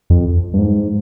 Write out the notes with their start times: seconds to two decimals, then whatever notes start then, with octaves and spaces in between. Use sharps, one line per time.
0.10 F2
0.54 G2
0.59 G#2